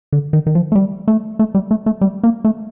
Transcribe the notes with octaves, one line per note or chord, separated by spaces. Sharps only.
D3
D#3
D#3
F3
A3
G3
A3
A3
G3
A3
A3
G3
A#3
A3